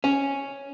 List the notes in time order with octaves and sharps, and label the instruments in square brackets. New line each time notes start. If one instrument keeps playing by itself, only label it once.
[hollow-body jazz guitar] C#4